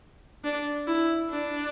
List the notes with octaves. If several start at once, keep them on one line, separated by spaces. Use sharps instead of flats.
D4
E4
D4